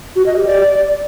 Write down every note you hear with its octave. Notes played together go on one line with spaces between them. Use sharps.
F#4
D#5
G4
D5